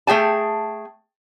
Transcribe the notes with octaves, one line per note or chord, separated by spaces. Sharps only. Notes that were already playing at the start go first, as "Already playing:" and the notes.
A3 G#4 G5 A5